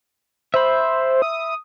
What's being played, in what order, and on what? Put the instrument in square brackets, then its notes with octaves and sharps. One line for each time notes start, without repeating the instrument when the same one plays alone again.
[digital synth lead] C5 [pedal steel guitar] E5 B5
[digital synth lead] D#6